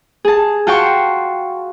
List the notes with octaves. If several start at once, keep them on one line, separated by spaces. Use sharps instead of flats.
G#4 A5
F4 F#4 G5 A5 C6 C#6